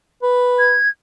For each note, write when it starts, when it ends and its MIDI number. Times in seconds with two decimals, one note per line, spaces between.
0.23 0.75 71
0.59 0.89 92